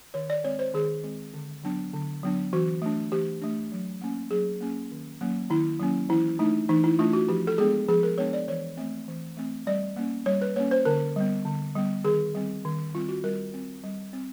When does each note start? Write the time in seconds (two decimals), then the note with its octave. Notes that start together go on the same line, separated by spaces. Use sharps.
0.14 D#3 C#5
0.30 D5
0.44 G#3 C4 C#5
0.59 C5
0.74 D#3 G#4
1.04 G#3 C4
1.34 D3
1.64 F#3 B3 D4
1.93 D3
2.23 F#3 B3 D4
2.53 E3 F#4
2.82 A3 D4
3.12 E3 G4
3.42 A3 D4
3.72 F#3
4.01 A#3 C#4
4.31 F#3 G#4
4.60 A#3 C#4
4.91 D#3
5.21 F#3 A#3 C#4
5.50 D#3 E4
5.80 F#3 A#3 C#4
6.09 E3 E4
6.39 A3 D4 D#4
6.69 E3 D#4
6.84 E4
6.99 A3 D4 F4
7.13 F#4
7.29 F3 G4
7.47 A4
7.58 G#3 B3 D4 G#4
7.89 F3 G#4
8.03 A#4
8.18 G#3 B3 D4 C#5
8.33 D5
8.48 E3 C#5
8.77 A3 C4
9.08 E3
9.37 A3 C4
9.67 G3 D5
9.96 A#3 C#4
10.26 G3 C#5
10.42 B4
10.56 A#3 C#4 C#5
10.71 C5
10.85 D3 A#4
11.16 G3 B3
11.45 D3
11.75 G3 B3
12.04 D#3 G#4
12.35 G3 C4
12.65 D#3
12.94 G3 C4 F4
13.09 F#4
13.24 G3 A#4
13.54 C4
13.84 G3
14.13 C4